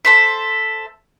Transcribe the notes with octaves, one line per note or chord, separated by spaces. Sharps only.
A4 C5 E5